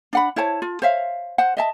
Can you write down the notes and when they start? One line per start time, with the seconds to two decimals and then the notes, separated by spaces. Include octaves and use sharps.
0.13 D4 F#5 B5
0.36 E4 C5 C#5 A5
0.62 F4
0.82 C5 C#5 E5 F5
1.38 C5 F#5
1.57 D#5 E5 A5